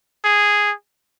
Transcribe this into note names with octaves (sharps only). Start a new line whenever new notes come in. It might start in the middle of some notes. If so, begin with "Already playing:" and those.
G#4